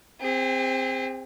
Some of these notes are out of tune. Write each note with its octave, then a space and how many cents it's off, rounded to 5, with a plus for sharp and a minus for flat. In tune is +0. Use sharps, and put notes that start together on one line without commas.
C4 +0 G#4 -40